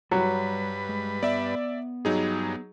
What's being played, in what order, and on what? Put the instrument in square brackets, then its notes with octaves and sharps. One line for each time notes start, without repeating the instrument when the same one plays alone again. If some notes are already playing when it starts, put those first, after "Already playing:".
[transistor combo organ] G2 B4 [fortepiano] F#3 [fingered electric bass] G3
[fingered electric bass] G#3
[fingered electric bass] B3 [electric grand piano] D5 E5
[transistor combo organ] G2 [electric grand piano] F#3 D#4 G#4